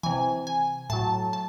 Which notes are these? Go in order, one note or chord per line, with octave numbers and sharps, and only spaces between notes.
C3 E3 G#5
G#5
A2 F#3 A5
A5